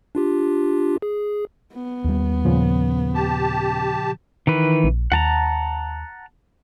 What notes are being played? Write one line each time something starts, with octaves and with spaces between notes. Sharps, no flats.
D4 F4 G4
G#4
B3
D#2 G3
A#2 C#3 F3
G4 A5
D#3 E3 B4
A#1
D#2 F#5 A5 A#5